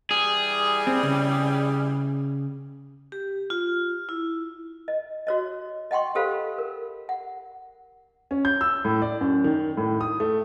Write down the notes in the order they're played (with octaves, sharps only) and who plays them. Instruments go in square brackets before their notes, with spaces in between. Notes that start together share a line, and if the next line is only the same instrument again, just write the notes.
[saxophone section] E3 G3 [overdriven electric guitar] G#4
[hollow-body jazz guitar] C4
C#3
[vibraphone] G4
F4
E4
[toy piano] D#5
F#4 C#5 D#5
D#5 F#5 G5 C6 C#6
G4 A4 C5 F5 B5
A#4
F#5
[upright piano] C#4
G6
E6
A2
D5
F#2
D#3
A2
D#6
A3